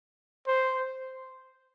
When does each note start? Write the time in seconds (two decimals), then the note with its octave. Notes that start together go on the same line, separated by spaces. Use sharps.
0.47 C5